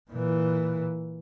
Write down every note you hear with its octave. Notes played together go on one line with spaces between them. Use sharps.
A#2 E3